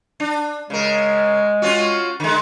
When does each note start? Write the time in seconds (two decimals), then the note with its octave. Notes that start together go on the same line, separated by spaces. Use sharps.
0.20 D4
0.70 C#3 G#3 A#4
1.62 C#4 F4 F#4
2.20 D3 G#3